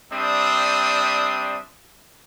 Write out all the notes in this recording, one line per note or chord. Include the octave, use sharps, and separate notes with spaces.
G3 C4 D4 E5 D#6